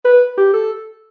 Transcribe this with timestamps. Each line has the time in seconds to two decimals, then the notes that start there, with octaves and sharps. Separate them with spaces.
0.05 B4
0.38 G4
0.54 A4